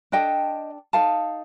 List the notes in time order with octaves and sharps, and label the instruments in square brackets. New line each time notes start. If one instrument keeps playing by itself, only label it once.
[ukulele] D4 A4 D#5 G5
D#4 A4 F5 A5